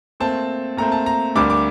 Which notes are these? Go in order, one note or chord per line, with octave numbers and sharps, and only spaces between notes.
A#2 A3 C4 A5
A#2 A3 C4 A#5
A5
A#5
D2 D3 G3 A#3 D6
D6